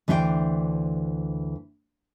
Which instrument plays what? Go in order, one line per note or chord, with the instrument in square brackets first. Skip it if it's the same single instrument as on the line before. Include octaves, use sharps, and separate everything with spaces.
[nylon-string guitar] D2 E3 D4 C5 C#5 G5